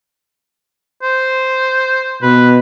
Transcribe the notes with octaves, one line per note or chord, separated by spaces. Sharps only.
C5
B2 B4